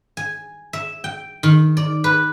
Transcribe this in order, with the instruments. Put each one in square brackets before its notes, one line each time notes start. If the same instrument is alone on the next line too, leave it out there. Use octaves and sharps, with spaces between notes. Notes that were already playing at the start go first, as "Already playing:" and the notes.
[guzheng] G#5
E5
G5
D#3
D5
B4